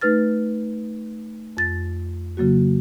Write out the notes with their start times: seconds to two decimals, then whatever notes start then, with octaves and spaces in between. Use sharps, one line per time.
0.01 A3 D#4 B4 F6 A6
1.57 F2 A6
2.37 C#3 F#3 A#3 F#4